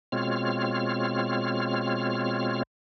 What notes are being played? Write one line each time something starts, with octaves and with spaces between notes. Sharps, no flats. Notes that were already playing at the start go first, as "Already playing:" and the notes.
B2 G#3 C4 F4 C#5 F6